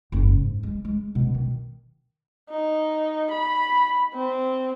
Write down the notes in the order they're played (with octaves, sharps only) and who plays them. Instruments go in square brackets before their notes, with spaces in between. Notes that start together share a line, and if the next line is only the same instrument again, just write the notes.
[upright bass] F#1
G#2
G#3
G#3
B2
D#3
[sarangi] D#4
B5
C4